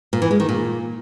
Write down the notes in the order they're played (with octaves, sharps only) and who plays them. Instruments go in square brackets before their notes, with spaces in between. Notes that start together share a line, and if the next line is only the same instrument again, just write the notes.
[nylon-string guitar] A#2
E3
G#3
D#3
A#2